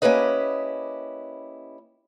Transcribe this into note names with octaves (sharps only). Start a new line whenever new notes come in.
A#3 C#4 E4 G4 B4 D#5